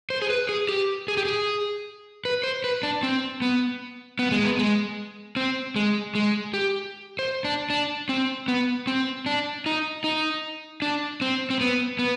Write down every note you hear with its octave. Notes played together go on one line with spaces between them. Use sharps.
C5
G#4
B4
G#4
G4
G#4
G4
G#4
B4
C5
B4
D4
C4
B3
B3
G#3
B3
G#3
C4
G#3
G#3
G4
C5
D4
D4
C4
B3
C4
D4
D#4
D#4
D4
C4
C4
B3
B3